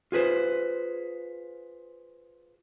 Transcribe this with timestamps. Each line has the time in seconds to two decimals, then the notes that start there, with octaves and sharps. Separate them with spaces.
0.12 F4 G#4 B4 C5